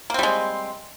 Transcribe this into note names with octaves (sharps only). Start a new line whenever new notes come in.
G3 G#3 A#3 C4